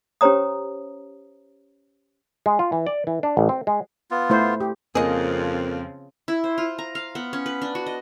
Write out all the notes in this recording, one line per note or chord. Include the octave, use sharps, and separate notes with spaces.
C#4 G4 C5 C#5 A#5 D#6
G#3
F4
E3
D5
E3
D4
A1
C4
G#3
B3 F4
A3 E4 C5
G4
F2 C#3 F3 A#3 C4 G#4 D#5
E4
C5
F4
A#5
F5
B3
C#4
B4
D4
F#4
D#5